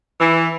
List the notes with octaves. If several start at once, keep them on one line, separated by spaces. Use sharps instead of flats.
E3